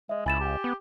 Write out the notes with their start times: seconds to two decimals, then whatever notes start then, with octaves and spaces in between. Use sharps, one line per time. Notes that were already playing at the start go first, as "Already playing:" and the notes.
0.09 G#3 D#5 E5
0.26 C#2 E4 G#5 A6 E7
0.39 G4
0.64 B3